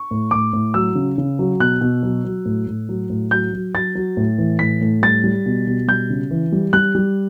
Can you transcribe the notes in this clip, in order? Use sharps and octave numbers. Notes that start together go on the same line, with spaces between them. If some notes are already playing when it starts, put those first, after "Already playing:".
Already playing: C#6
A2
A2 D6
A2
F#3 E6
C#3
C#3
F#3
B2 F#6
B2
F#3
F#3
A2
A2
F#3
A2
F#3 G6
F#3
F#3 A6
F#3
A2
E3
A2 B6
A2
G3 A6
G3
B2
B2
G3 G6
C#3
E3
G3
G3 F#6
G3